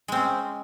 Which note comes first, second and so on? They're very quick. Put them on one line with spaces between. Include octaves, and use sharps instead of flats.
G#3 C4 C#4